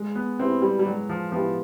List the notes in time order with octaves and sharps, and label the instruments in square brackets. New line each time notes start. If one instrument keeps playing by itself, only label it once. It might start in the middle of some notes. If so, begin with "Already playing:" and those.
Already playing: [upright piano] G#3
[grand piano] B3
[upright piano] B3 E4 G4 [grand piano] C4
[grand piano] G3
G3
[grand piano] F#3 [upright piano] G#3
[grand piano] F3
[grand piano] F3 [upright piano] B3 E4 G4